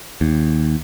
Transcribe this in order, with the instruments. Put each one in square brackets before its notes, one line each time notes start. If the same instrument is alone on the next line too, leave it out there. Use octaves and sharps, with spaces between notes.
[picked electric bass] D#2